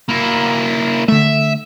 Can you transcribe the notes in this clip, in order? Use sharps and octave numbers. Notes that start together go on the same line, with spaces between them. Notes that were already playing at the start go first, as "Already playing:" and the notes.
A#3 E4
D3 A3 E5